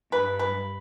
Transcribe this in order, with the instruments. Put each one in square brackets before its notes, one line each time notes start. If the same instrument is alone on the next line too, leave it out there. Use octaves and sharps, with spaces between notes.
[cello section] G2 [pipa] B4
[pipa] B4